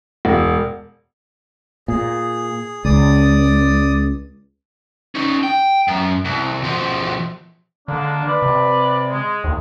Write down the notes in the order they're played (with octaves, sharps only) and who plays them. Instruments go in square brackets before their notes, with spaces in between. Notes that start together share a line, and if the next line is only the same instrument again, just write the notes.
[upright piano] E1
[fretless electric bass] A#2 [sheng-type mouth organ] G#4
[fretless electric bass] C#2 [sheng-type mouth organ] D5 D#6
[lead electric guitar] C#4 D#4
G5
F#2
C2
B2 F3
[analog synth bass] D3 [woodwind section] G#3 A#3 D4
[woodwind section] B4 D5
[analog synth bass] C3
[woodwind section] G#3
[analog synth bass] D#2